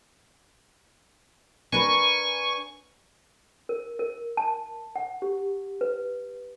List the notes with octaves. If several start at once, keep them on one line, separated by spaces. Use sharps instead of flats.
D4 A#4 B4 G#5 C#6
A#4
A#4
A5
F#5
G4
B4